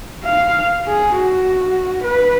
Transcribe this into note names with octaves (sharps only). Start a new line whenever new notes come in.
F5
G#4
F#4
B4